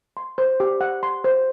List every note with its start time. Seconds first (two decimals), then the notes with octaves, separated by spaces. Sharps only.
0.17 C6
0.38 C5
0.60 G4
0.81 F#5
1.03 C6
1.24 C5